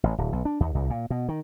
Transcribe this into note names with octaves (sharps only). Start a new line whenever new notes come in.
A1
D1
B1
D4
D#2
C2
A#2
B2
D#3